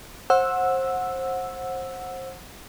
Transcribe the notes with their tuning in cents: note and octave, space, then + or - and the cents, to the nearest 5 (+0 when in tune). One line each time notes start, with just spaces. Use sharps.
C5 +25 F#5 -15 E6 +0